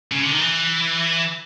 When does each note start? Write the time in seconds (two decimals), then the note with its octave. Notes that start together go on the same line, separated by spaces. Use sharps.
0.12 C#3
0.22 D3
0.31 D#3
0.40 E3